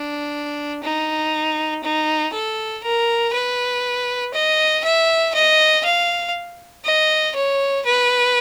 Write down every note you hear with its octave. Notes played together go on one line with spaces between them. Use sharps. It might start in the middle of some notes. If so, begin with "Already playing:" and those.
Already playing: D4
D#4
D#4
A4
A#4
B4
D#5
E5
D#5
F5
D#5
C#5
B4